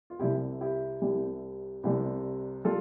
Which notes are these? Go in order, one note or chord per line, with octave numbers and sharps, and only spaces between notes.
F4
C2 C3 G3 E4 G4
E4 G4
C2 C3 G3
C2 C3 G3
G3 F4 A4